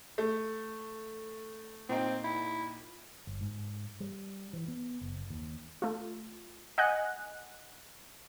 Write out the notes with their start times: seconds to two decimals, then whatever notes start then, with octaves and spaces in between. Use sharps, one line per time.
0.18 A3
1.89 A#2 C4 D#4 G5
2.25 E4
3.27 G1
3.41 G#2
4.00 G3
4.53 E3
4.68 B3
5.01 F#1
5.30 D#2
5.82 A3 F4
6.78 D#5 F#5 G#5 F#6